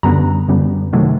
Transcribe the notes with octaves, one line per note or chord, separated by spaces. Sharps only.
F#2 D3 G3 B3 A#5
F#2 D3 G3 B3
C3 D#3 F#3 A3